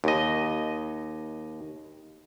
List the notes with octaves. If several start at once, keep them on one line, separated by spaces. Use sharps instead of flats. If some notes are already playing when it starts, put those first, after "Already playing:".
D#2 D#5